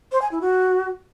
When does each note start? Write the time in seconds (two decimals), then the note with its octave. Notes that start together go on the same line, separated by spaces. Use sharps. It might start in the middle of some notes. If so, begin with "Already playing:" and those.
0.12 C5
0.22 G#5
0.31 E4
0.41 F#4